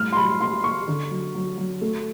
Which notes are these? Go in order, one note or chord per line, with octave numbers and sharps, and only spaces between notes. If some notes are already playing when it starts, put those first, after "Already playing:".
Already playing: A2 G3 F6
C6
F#3 B5
A#3 C6
A#3 C#6
D3
F#3
F#3
F#3
A3